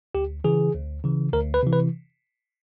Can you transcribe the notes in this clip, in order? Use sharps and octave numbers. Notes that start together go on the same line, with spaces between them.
D2 G4
C#3 E3 G#4
D2
C#3 E3
D2 A#4
B4
C3 E3
B4